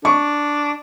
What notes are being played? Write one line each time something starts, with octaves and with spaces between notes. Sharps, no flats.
D4 C#6